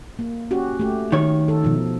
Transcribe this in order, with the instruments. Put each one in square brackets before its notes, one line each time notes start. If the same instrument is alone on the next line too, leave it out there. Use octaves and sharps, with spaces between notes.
[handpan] A#3
C#4 F#4 G4
A3 G4
[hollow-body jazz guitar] D#3 C#5
[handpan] A4
B2 F3 D#4